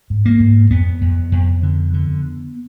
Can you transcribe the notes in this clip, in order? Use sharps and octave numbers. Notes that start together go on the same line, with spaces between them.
G#2
A#3
G#2
F2 B3
F2
F2
D3
D3